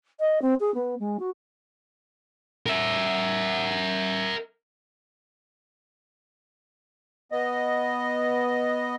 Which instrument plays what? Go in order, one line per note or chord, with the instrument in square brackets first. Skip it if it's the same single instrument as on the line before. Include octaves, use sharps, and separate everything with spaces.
[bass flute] D#5
C4
G#4
B3
G#3
F#4
[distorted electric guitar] A#4 E5
[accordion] B3 D#5